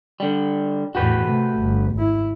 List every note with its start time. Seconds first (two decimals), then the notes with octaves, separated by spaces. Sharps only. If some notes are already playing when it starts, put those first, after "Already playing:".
0.20 D3 G3
0.95 E2 A2 F#4 G4 B4
1.24 C3 A3
1.60 G1
1.96 G#1 E4